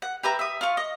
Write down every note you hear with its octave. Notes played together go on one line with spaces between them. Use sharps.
F#5
G4 B4 E5 A#5
E5 D#6
F4 F5 C#6
D#5